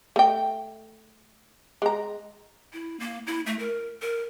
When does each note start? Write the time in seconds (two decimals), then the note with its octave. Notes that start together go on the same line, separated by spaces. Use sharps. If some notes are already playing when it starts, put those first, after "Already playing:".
0.16 A3 G5
1.82 G#3 A#5
2.73 E4
3.00 A#3
3.27 E4
3.46 A3
3.59 A#4
4.02 A#4